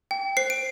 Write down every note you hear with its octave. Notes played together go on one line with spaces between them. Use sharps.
G5
C5 C7
D7